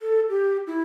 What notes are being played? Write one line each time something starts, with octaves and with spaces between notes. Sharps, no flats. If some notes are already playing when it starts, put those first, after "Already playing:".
A4
G4
E4